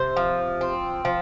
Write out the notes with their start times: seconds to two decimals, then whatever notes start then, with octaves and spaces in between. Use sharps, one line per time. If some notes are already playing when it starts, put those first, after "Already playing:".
Already playing: C3 C5
0.17 F3
0.61 C4
1.05 F3